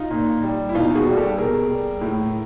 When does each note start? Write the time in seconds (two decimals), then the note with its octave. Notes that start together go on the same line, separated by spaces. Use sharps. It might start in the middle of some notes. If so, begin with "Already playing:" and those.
Already playing: D#4 F4
0.11 A#2
0.43 G3
0.69 E4
0.75 B2 D#4 F4
0.95 F#4 G#4
1.06 G3
1.17 G4 A4
1.38 B2 G#4 A#4
1.69 G3
2.01 A2